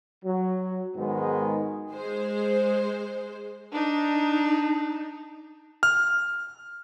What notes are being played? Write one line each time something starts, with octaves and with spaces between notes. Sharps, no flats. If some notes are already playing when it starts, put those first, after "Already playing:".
F#3
G#2 D#3 G#3 B3 D#4 F#4
G#3 C5
D4 D#4
F6